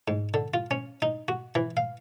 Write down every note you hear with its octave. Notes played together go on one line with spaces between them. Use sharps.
G#2
D3
F4
C#4
D#4
F#4
E3
F5